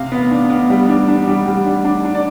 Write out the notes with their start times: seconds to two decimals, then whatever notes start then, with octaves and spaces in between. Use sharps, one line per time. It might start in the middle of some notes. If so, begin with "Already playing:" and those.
Already playing: C3 F5
0.12 B3
0.31 D4
0.50 B3
0.70 G3
0.88 D4
1.08 D4
1.27 G3
1.46 G3
1.66 D4
1.85 D4
2.05 D4
2.15 D5